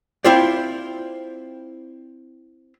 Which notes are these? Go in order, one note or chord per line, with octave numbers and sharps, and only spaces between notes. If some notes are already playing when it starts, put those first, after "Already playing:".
C4 E4 F4 C5 D5